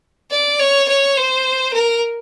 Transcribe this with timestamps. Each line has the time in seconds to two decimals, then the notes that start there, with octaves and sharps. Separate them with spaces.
0.31 D5
0.59 C#5
0.88 C#5
1.17 C5
1.73 A#4